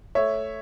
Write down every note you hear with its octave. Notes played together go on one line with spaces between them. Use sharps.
A3 C#5 E5